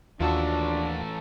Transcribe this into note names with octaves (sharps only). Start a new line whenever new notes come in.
D#2 E3 A3 D4 F4 F#4 E5 A5